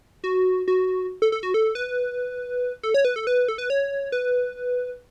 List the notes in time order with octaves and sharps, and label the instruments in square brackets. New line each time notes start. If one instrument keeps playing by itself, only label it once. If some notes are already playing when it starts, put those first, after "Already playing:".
[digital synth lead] F#4
F#4
A4
A4
F#4
A4
B4
A4
C#5
B4
A4
B4
A4
B4
C#5
B4